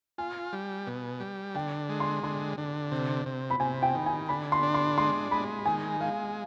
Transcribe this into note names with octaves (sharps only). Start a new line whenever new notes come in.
F4 G#5
G3
B2
G3
D3 G5
G#3
C6
D3 C6
D3
C3
C3
B5
C3 G#5
G5
D#3
G#5
D3 B5
C6
D4
C6
G#3 C6
G#3 B5
D#3 G#5
G#3 F5